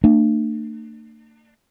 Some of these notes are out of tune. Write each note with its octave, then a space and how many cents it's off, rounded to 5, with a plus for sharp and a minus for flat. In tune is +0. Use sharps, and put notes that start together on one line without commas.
A3 +45 D4 +35